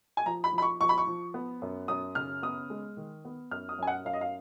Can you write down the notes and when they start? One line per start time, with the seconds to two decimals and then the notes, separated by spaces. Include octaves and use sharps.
0.17 G#5
0.26 F3 A#5
0.44 B5
0.53 F3
0.58 B5
0.62 C#6
0.81 F3 C#6
0.89 B5
0.98 C#6
1.07 F3
1.34 B3
1.62 F#2
1.88 F#2 D#6
2.15 C#3 F6
2.42 B3 D#6
2.70 G#3
2.97 D#3
3.25 B3
3.51 F#2 F6
3.69 D#6
3.78 F#2 G#5
3.87 F#5
4.05 F#2 F5
4.13 D#5
4.21 F5